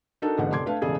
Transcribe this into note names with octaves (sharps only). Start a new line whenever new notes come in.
D4 D#4 F#4 A4 A#4
E1 A1 G#2 D3 A#3 F#5
F1 C6 D6 G#6
A3 D4 B4 F5
E1 A1 C#3 G#4 A4